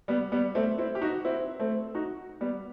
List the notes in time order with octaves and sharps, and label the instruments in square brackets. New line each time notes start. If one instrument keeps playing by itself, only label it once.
[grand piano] G3 B3
G3 B3
A3 C4
C4 E4
G4
D#4 F#4
C4 E4
A3 C4
D#4 F#4
G3 B3